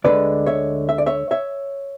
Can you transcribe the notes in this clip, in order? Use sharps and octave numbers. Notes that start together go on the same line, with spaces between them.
D2 D3 G#3 B4 D5
C#5 E5
E5
D5
C#5 E5
C#5 E5